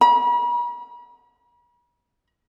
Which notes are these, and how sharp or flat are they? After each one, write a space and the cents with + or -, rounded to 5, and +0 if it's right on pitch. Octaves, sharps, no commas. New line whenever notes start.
B5 -45